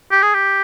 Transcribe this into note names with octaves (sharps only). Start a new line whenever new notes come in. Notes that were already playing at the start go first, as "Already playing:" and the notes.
G4
G#4
G4